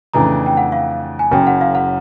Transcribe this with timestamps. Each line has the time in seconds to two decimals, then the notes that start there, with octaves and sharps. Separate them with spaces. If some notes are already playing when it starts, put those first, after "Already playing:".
0.13 F2 C#3 E3 A3 D4 A#5
0.46 G5
0.57 F#5
0.72 F5
1.19 G#5
1.31 F#1 F#2 C#3 G5
1.47 F#5
1.61 F5
1.75 F#5